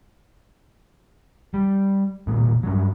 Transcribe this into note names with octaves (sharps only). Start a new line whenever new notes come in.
G3
E1 A#2
G2 F#3